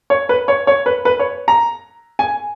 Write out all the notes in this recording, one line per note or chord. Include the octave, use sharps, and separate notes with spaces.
C#5
B4
C#5
C#5
B4
B4
C#5
A#5
G#5